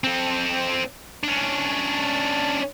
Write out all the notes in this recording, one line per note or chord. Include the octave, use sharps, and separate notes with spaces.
C4 A4
C#4 D4